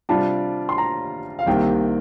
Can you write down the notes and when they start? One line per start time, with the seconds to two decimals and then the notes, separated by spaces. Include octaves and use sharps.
0.09 C3 G3 D4 F4 A5
0.69 C6
0.78 A#5
1.39 F5
1.46 C2 C3 D#3 A#3 G5